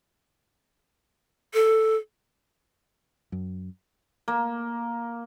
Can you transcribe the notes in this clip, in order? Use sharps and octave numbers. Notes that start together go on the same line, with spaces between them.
A4
F#2
A#3